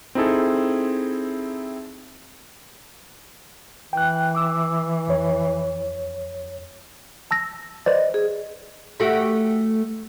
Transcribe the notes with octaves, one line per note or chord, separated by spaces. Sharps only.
C4 D#4 E4 G#4 A4
E3 G5 F#6
D6 E6
F2 C#5
A5 E6 A#6
B4 C5 D5 D#5
G#4
A3 F#4 G4